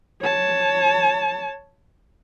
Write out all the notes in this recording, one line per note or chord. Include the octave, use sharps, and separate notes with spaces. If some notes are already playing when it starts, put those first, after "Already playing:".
C#5 A5